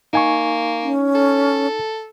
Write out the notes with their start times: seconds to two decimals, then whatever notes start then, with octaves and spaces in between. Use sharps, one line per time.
0.13 A#3 D#4 G#5 C#6
0.83 C#4
1.15 A4